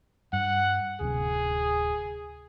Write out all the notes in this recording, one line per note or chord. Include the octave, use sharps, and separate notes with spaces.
G2 F#5
D1 C3 G#4